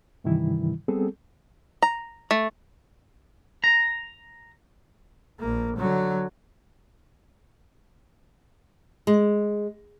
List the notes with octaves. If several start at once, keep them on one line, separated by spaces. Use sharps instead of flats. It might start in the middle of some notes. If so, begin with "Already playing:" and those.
G2 C3 D#3 E3 G3 E4
G3 B3 C4 G#4 A4
A#5
A3
A#5
A#1 A#3
D3 F#3
G#3